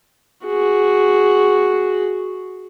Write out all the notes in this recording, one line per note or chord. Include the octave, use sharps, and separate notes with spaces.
F#4 G#4